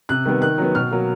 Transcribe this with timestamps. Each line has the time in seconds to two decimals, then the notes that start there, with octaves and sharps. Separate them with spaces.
0.09 C3 F#6
0.25 D#3 G3 B3
0.42 D#3 F#6
0.58 F#3 B3
0.75 B2 F6
0.91 F#3 A#3